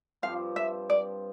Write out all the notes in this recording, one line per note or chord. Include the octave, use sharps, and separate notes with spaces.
G2 F3 C4 F5
E5
D5